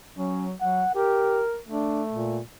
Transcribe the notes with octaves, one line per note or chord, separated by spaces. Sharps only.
F#3 C#4
F#3 F#5
G4 A#4
A3 D4
A#2